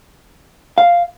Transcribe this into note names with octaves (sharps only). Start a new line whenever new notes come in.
F5